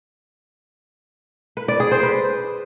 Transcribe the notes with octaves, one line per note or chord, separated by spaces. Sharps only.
B4
D5
G#4
C5
B4